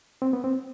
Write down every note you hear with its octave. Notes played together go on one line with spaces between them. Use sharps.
C4
B3
C4